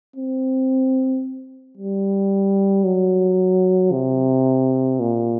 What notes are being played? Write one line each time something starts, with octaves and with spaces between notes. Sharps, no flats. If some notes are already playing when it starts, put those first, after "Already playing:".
C4
G3
F#3
C3
A#2